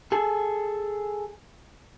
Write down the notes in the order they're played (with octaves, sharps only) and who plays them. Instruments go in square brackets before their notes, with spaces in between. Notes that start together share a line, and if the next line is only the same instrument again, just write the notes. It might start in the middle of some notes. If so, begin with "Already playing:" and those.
[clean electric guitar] G#4 A4